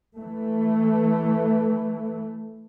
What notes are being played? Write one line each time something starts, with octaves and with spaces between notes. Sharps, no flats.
E3 A3